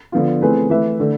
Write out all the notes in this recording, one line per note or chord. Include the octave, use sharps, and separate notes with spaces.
D3 F3 B3 F4
E3 A3 C4 G#4 B4
E3 A3 E4 B4 E5
D3 A3